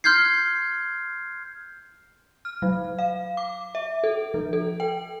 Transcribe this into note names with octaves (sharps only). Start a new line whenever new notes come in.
C6 F6 G6 G#6 C7
F6
F#3
F5
D6
E5
A4
F3
A4
G5